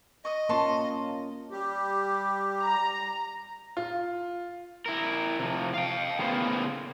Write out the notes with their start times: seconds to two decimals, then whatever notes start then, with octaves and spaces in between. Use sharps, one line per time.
0.25 D#5 C#6 D#6
0.49 A#3 C#4 F4 A5 C6 C#6
1.51 G3 G4
2.61 A#5
3.77 F4
4.86 E4 A#4
5.39 C3 F3
5.74 F5 G5
6.19 A2 C#3 A#3 B3 C5